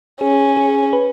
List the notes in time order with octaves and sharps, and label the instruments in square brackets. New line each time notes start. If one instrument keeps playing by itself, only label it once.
[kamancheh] C#4 [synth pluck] G#4
[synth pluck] G#4
B4